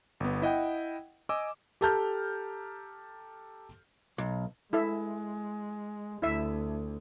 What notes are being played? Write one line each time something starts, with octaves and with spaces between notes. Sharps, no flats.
G1 B3
E4 D#5 F#5 G5
D#5 G#5 D6 E6
G4 A4 A5 A#5 F6 G6
B1
G#3 E4 A4 E5
D2 E4 E5